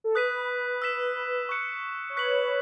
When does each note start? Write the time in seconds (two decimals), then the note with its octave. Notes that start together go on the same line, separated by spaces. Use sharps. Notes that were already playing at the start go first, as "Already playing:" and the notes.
0.04 A4
0.15 B4 D#6 F#6 B6 D#7
0.82 E6 B6 E7
1.49 C#6 F#6 C#7
2.10 C#5
2.17 B4 F#6 B6 F#7
2.42 B4